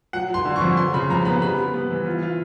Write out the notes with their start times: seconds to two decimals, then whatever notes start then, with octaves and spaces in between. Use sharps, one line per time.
0.13 F#3 F#5
0.30 F#3 C6
0.45 D3
0.56 C#6
0.61 F2
0.77 F#3 C6
0.93 C#3 B5
1.09 F2 A#5
1.25 B3 B5
1.42 G3 B5
1.58 G3
1.74 B3
1.91 E3
2.06 F4
2.22 F4